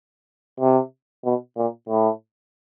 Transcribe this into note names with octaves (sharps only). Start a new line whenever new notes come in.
C3
B2
A#2
A2